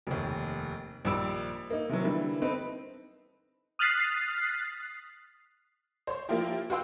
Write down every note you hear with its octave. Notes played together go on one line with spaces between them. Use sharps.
F1 D#2
A#1 D#3 G3 E6 D7
A#3 D#4
C3 D#3 E3 F#3
D3 E3 G3 A#3
C4 D#4 A4 B4
D#6 F6 F#6 A6 B6 C7
C5 C#5 C6
F3 A#3 E4 F4 G4
F#4 B4 F5 G5 C6 E6